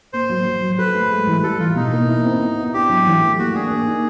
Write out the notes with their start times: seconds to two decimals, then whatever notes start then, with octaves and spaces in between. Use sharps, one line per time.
0.13 A#3 C5
0.29 F#3
0.45 F#3
0.62 F#3
0.78 A4 B4
0.94 A3
1.11 G#3
1.27 E3
1.43 G3 A4
1.59 E3 F4
1.75 B2 D#4
1.92 A#3
2.08 E4
2.25 C4
2.40 B3
2.58 E4
2.74 D4 G4
2.89 F#3
3.07 E3
3.22 A3
3.38 A#3 F#4
3.55 D4 G#4
3.71 A#3
3.87 D#4